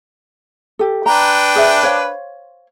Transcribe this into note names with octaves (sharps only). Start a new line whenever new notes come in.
G4 A4
D4 B4 G5 A#5
G#4 C5 E5
C5 C#5 F5